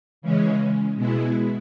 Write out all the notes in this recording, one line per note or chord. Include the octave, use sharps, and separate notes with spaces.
C#3 E3 G#3 C#4
B2 G#3 B3 E4